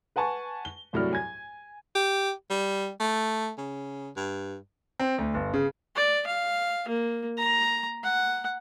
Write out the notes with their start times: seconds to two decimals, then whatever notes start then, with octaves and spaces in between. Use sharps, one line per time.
0.16 B4 F#5 G#5 A5 C#6
0.65 G7
0.93 C2 A2 F#3 D5 F6
1.13 G#5 G#6
1.95 G4
2.50 G3
3.00 A3
3.58 C#3
4.16 G2
5.00 C4
5.18 D2
5.34 G1
5.54 C#3
5.96 D5
6.27 F5
6.89 A#3
7.38 A#5
8.03 F#5